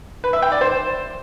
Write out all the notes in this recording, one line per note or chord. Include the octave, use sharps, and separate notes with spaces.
B4
E5
G5
D5
C5